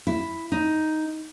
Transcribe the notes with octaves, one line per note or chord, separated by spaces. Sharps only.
E4
D#4